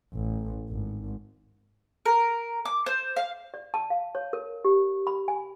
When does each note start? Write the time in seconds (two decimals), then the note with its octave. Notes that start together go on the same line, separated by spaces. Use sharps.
0.14 A1
0.69 G#1
2.06 A#4
2.65 D6
2.86 C5
3.16 F5
3.54 D5
3.74 A5
3.90 F5
4.15 C#5
4.33 A#4
4.65 G4
5.07 B5
5.28 G#5